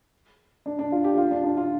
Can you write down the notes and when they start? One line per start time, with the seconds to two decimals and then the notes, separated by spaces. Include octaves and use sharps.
0.66 D4
0.79 D4
0.92 F4
1.04 D4 G4
1.14 G4
1.18 F4
1.31 D4
1.44 D4
1.57 F4